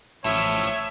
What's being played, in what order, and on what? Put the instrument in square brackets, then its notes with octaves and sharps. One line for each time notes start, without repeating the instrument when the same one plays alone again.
[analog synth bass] A1 [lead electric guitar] A2 F3 [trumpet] C#5 [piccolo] E5